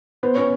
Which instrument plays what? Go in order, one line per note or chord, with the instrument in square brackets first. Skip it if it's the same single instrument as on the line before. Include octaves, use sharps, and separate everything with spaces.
[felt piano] B3 [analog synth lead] C5
[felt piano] B3 C#4 [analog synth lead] C#5